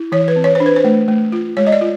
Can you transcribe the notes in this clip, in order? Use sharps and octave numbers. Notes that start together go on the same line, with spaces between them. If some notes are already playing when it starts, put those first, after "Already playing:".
Already playing: E4
E3 C#5
B4
C4
C#5
C5
D4
B4
C5
A3
A3
F4
G#3 C#5
D#5
D5
F4